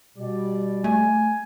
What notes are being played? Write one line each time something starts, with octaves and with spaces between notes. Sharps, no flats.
B2 G3 D5
A3 G#5